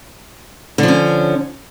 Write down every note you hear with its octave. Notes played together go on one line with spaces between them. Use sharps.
D3 F3 C#4